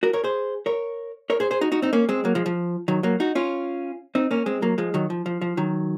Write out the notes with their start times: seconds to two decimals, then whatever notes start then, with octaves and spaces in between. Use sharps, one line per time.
0.03 F#4 A#4
0.13 A#4 C#5
0.24 G#4 C5
0.66 A#4 C#5
1.30 A#4 C#5
1.40 G#4 C5
1.51 G#4 C5
1.61 D#4 F#4
1.72 D#4 F#4
1.82 C4 D#4
1.93 A#3 C#4
2.09 G#3 C4
2.25 F#3 A#3
2.35 F3 G#3
2.46 F3
2.88 D#3 F#3
3.03 F#3 A#3
3.20 D#4 F#4
3.35 C#4 F4
4.15 C4 D#4
4.31 A#3 C#4
4.46 G#3 C4
4.62 F#3 A#3
4.78 F3 G#3
4.94 D#3 F#3
5.10 F3
5.26 F3
5.41 F3
5.57 D#3 F#3